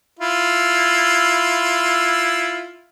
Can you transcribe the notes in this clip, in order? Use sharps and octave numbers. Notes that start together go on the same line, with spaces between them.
E4 F4